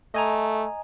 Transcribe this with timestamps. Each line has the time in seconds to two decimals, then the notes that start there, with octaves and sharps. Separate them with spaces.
0.14 A3 D#5 G#5 A#5